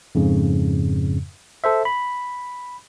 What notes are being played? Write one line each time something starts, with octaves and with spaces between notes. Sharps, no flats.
F2 G#2 C#3
A4 C5 E5
B5